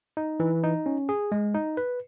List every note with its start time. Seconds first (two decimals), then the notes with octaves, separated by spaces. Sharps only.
0.17 D#4
0.40 E3
0.64 D#4
0.86 C#4
1.09 G#4
1.32 G#3
1.54 D#4
1.77 B4